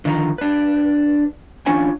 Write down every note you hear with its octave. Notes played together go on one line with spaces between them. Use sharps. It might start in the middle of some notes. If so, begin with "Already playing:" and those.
D3 D#3 F3 A5 A#5
D4 B4
E3 C#4 D4 F4 C#5 G#5